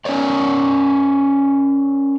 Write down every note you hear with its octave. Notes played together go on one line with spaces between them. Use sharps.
C#4 F4 A#4 C#5 D5